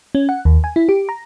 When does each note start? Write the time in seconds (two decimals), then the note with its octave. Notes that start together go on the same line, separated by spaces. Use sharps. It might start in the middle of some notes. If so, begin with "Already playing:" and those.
0.15 C#4
0.29 F#5
0.45 D#2
0.64 G#5
0.76 E4
0.89 G4
1.09 A#5